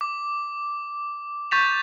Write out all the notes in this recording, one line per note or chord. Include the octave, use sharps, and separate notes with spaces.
D6
C#6 G6 A6 B6 E7 F7